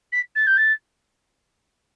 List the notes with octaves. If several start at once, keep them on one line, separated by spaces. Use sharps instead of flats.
B6
A6
G6
A6